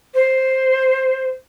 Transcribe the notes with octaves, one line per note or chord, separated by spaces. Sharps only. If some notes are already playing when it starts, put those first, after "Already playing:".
C5